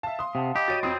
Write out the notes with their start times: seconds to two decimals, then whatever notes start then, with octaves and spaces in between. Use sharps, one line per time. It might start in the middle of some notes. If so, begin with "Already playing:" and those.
0.03 E5 F5 A5
0.19 C6 D#6
0.35 C3 F5 F#5 A5
0.56 G4 D#5 B5 D#6
0.68 F#4 C#5 A6 D7 D#7
0.83 F2 C4 D#6 G6